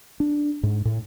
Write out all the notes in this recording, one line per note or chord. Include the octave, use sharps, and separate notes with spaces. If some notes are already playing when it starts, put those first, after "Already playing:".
D4
G#2
A2